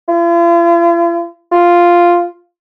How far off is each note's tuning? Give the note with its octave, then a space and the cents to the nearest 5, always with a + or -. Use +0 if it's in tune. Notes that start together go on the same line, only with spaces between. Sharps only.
F4 -45
F4 +0